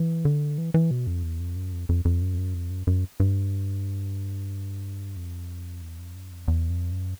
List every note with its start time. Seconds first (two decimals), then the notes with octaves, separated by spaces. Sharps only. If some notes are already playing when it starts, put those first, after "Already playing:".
Already playing: E3
0.25 D3
0.58 E3
0.74 E3
0.91 B2
1.07 F2
1.23 E2
1.40 F2
1.56 F#2
1.73 F2
1.89 F2
2.05 F2
2.22 F#2
2.34 F2
2.38 F#2
2.54 F2
2.71 F#2
2.87 F#2
3.20 G2
5.16 F2
5.82 E2
5.99 F2
6.15 F#2
6.31 F2
6.48 E2
6.70 F2
6.91 F#2